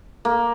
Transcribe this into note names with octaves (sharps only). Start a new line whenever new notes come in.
A#3